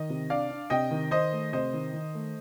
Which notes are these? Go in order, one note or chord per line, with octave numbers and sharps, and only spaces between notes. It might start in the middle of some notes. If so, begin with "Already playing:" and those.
Already playing: D#3 D#5
C3
D4 D5 F5
D4
C3 D#5 G5
D#3
D#3 C5 D#5
A3
C3 C5 D#5
D#3
D#3
A3